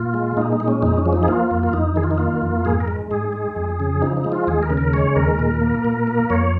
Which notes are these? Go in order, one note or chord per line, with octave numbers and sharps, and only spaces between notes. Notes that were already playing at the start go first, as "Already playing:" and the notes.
Already playing: A#2 F4
G#3
A#2 D#4
D#4
G#3
C#4
F2 D#4
C#4
F3
D#4
G#4
A#3 F4
F2
F4
F2 D#4
D#3 G#4
F4
D#4
A#3 F4
F2
G#2 G#4
A#4
G#3
G#2 G#4
G#3
F2
C#3
F3 D#4
D#4
G#3
F4
D#2 G#4
A#4
C#3
A#4
G#3 C#5
D#2 A#4
A#2
A#3
A#2
A#3
F2 C#5